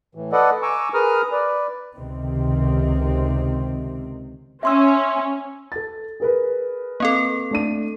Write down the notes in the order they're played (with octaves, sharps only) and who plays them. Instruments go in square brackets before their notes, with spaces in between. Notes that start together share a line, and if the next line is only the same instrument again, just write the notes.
[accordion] A2 E3
A4 B4 D5 D#5 F#5
G#5 A#5 C#6 D6 E6
G#4 A#4 B4 A#5 D#6 F6
B4 D5
[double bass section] C#2 C3 D#3 C4
[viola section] C#4 [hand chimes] E5 C6 E6
[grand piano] A4 A6
G#4 A#4 B4
[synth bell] A#3 C4 A4
[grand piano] A3 D4 D#7